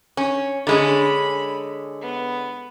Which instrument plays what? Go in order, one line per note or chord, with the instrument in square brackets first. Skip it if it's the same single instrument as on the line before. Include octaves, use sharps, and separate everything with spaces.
[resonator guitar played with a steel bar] C#4
[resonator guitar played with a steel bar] D3 G#3 C#4 [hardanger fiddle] B5
[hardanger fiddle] B3